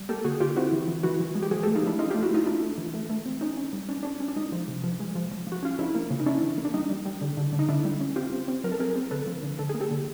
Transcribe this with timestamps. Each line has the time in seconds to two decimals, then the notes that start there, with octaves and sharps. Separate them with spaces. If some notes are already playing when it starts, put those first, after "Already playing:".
Already playing: G3
0.09 A#3 G4 A4
0.24 D3 F#4 G#4
0.40 D3 F4 G4
0.56 C4 E4 F#4
0.72 E3
0.88 E3
1.03 E3 E4 F#4
1.20 E3
1.35 G#3
1.43 G4
1.51 F3 F#4 G#4
1.63 A3 G4 A4
1.75 D#4 F4
1.83 F3 D4 E4
1.99 C#4 D#4 F4
2.10 A3 F4 G4
2.23 E4 F#4
2.31 A3 D#4 F4
2.46 A3 D4 E4
2.62 A3
2.78 E3
2.94 A3
3.10 A3
3.26 C4
3.41 C#4 D#4
3.57 C#4
3.73 G3
3.89 C#4 D4
4.03 C#4 D4
4.20 C#4
4.28 D4
4.36 G#3 D#4
4.52 F3
4.68 C3
4.84 F3
5.00 G#3
5.15 F3
5.31 F3
5.47 F3
5.52 F#4
5.63 C#4 F4
5.79 F3 D4 E4
5.95 A#3
6.10 C#3
6.20 D#4
6.26 C#4 D4 E4
6.42 E3
6.58 A#3
6.65 D4
6.74 G3 D#4
6.90 G3
7.05 G3
7.21 D3
7.37 D3
7.53 D3
7.59 D#4
7.69 D3 D4 E4
7.85 G3
8.01 C#4
8.16 C4 F4 G4
8.32 C4
8.48 C4
8.64 F#3 A#4
8.72 A4
8.80 C4 G#4 A#4
8.96 C4
9.11 D3 A4 B4
9.27 F3
9.43 D3
9.59 D3 A4
9.69 A#3 G#4
9.81 G4 A4
9.91 D3